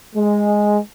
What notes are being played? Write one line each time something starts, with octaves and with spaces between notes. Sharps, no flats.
G#3